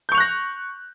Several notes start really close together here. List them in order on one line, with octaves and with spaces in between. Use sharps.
G6 C#6 F7 F#6 A#6